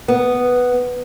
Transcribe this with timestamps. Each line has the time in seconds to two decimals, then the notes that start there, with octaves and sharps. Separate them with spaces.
0.08 B3